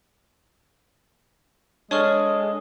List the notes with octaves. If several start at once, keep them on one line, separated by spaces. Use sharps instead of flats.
G#3 D4 G#4 A4 C#5 C#6 F6